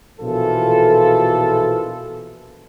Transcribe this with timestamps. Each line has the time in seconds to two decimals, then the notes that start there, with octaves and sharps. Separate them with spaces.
0.20 A#1 B2 E3 F4 A4